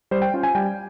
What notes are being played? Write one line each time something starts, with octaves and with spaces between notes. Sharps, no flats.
G3 C5
G5
C#4 F4
G#5
G3 G5